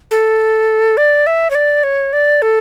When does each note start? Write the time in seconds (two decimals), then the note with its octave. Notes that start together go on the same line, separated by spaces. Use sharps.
0.11 A4
0.97 D5
1.27 E5
1.50 C#5
1.55 D5
1.83 C#5
2.13 D5
2.42 A4